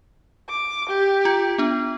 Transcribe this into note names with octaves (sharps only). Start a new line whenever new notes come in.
D6
G4
F4
B3 D4